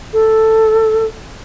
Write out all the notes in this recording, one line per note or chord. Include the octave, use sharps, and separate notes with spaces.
A4